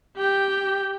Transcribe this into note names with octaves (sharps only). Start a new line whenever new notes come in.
G4 G5